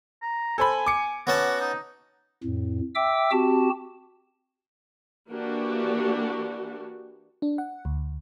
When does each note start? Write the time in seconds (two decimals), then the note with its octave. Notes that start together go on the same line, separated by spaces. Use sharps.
0.22 A#5
0.58 A4 C5 G#5 B5
0.86 D6 C#7
1.27 B3 C#4 F#4 A5
1.60 D#4
2.43 F2 A2
2.95 E5 G5 D6 E6
3.31 C4 F#4 G4 A5
5.30 E3 A#3 D4 F#4 G4
7.42 D4
7.58 F#5
7.85 D2